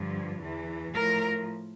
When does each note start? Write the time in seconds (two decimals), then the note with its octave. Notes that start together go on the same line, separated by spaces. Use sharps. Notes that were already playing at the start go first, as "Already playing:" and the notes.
Already playing: G2 D3 F3
0.42 E2 E3
0.94 A2 F3 A#4